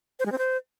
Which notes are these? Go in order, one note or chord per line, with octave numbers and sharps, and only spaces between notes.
C5
G#3
C4
C5